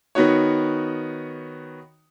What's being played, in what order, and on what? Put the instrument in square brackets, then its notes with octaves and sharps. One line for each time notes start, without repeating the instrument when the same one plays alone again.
[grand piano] D#3 B3 D#4 F#4 C#5